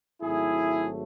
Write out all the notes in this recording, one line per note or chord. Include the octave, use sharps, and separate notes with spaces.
G#1 G#2 F#3 A3 E4 G#4